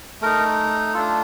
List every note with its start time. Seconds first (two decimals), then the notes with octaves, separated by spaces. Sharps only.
0.21 A3 D#4 A#4
0.94 A3 D4 F4 A4